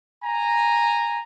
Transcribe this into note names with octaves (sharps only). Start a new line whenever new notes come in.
G#5 A#5